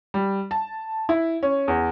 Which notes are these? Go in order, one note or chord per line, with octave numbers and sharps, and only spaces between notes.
G3
A5
E4
C#4
E2